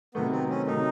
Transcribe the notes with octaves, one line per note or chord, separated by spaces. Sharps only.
C3 D#3 F#3 A3 B3
C4
C#4
C3 D#3 F#3 A3 D#4